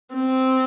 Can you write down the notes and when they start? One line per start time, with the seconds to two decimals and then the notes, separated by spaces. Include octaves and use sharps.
0.15 C4